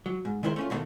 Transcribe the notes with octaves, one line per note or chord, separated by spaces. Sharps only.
F#3
G#2
D#3 G#3 E4 A#4 C5
A3 C#4 F4
B2 D3 D#3 A3 A#3